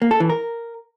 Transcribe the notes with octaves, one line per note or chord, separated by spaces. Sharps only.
A#3
A4
E3
A#4